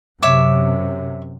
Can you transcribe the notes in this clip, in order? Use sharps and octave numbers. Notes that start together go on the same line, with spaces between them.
F#2 C3 C#5 E5 D6